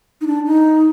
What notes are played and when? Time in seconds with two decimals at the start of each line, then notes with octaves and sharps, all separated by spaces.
0.21 D#4
0.27 D4
0.46 D#4